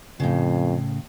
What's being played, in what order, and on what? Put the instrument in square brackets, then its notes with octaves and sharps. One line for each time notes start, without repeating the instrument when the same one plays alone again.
[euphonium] F2 [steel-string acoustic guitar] A2 C#3